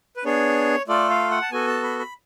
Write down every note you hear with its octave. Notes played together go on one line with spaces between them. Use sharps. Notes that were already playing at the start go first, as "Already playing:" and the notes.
B4
B3 D4 G#4 C#5
A3 F4 A4 D5
F5
F#5
A5
B3 F#4 A4 G#5
A5
B5
B5